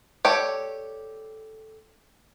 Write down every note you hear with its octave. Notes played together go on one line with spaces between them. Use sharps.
A3 G4 C#5 D5